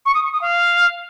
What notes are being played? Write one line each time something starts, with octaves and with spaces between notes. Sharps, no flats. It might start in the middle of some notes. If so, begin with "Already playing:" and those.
C#6
D#6
C#6
D#6
F5